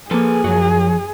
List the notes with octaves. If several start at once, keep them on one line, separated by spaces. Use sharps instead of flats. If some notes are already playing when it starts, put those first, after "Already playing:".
F3 A#3 G#4 A4 B4
F#2 F3 F#3 F#4